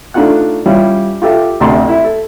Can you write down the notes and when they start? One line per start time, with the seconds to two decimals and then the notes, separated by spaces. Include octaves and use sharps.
0.14 A3 D4 D#4 F4 F#5 F#6
0.66 G3 C#4 E4 F4
1.22 F4 G4 A4 E5
1.60 A1 D2 C3 A4 C6
1.89 E4
2.05 A4